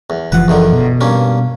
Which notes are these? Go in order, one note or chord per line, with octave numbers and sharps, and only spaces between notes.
E2
F#1 E3 F3 B4 F#5
E2 D3 D#3
B2
G2 A#3 C#4